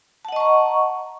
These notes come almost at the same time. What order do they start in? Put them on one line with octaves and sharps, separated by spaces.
A5 F#5 D#5 C#6 A#5